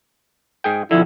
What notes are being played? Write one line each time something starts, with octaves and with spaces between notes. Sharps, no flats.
G#2 G#4 G5
B1 D3 F3 E4